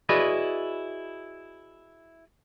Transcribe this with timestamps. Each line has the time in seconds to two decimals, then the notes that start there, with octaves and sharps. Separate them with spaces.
0.09 E4 F#4 G#4 B4 D5 D#5